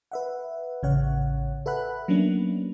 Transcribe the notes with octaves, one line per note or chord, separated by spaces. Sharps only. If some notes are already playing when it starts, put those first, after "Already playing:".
B4 E5 F#5
A1 C#3 C#5 F#5
A4 B4 E5 F#5 B5 F#6
F#3 A#3 B3 C#4 D4